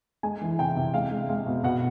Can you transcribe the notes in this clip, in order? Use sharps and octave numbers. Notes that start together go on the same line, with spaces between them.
G#3 G#5
E3
C3 G5
C3
G#3 F5
G#3
G#3 F5
B2
B2 F#5